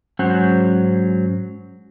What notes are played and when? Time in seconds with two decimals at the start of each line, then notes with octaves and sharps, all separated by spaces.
0.19 G#2 F#3 C#4 C5 F#5